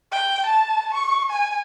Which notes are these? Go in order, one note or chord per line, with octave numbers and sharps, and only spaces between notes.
G5
A5
C#6
G#5